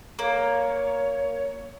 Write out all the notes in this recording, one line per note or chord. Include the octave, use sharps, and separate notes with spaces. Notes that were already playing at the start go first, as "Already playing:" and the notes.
A#3 C#5